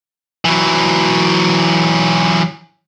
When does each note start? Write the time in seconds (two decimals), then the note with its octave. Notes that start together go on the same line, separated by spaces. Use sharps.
0.45 E3 F#3